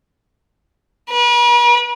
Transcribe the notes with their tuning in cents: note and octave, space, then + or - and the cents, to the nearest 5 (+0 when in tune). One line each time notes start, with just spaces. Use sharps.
B4 -45